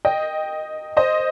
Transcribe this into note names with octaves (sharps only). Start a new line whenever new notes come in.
D#5 G5
C5 D#5